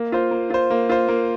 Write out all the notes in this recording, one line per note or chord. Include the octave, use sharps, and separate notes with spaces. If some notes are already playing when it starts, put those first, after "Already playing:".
Already playing: A#3
F4 C5
A#3
F4 C5
A#3
F4 C5
A#3